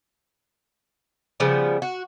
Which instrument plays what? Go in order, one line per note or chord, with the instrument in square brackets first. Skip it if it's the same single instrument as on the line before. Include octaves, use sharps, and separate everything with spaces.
[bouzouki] C#3 F3 G3 B3
F#4